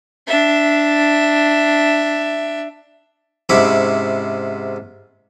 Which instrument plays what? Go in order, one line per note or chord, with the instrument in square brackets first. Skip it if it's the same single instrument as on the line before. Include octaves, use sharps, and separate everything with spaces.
[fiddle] D4 E5
[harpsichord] G#2 C3 C#4 E4 B5 D6